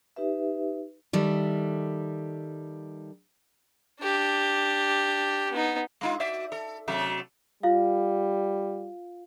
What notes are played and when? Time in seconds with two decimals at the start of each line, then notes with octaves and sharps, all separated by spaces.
0.16 D#4 G4 B4 E5
1.13 D#3 G3 A4 E5
4.02 D4 G4
5.52 B3 D#4
6.01 G#3 D#4 F4
6.20 F#4 D5 E5
6.52 A4
6.88 C3 F#3 A3
7.63 G3 F4 F5